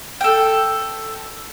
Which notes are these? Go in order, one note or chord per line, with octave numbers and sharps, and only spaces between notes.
A4 G5